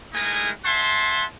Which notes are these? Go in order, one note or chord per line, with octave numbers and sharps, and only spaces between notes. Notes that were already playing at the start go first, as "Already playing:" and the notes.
G#3 A3 D#4 E4 A#4 G#5
E5 F#5 G#5 A5 C6